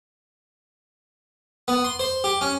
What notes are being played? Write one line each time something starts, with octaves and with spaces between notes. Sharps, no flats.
B3
C6
C5
G4
C#4